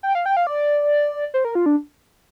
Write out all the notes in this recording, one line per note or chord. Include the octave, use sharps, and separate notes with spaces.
G5
F5
G5
F5
D5
C5
A#4
F4
D4